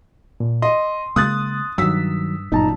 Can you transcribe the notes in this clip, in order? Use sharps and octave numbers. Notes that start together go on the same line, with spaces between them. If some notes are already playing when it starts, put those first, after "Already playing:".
A#2
D#5 C6
C#3 G#3 A#3 D#6 F#6 A6
G2 D#3 F#3 E6 B6
G1 F#2 A#2 D#4 A5 A#5